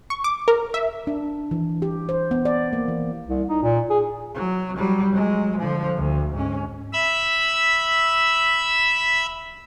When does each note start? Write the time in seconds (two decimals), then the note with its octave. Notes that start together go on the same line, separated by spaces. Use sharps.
0.10 C#6
0.24 D6
0.48 A#4
0.74 E5
1.07 D4
1.51 E3
1.82 G4
2.09 C5
2.31 B3
2.45 D5
2.73 A#3
2.88 E3
3.28 C2
3.48 D#4
3.63 A#2
3.90 G#4
4.34 F#3
4.77 F#3 G3
5.13 F#3 G#3
5.58 D3 F3
5.96 D2
6.34 G#2 C#4
6.93 E5 B5 E6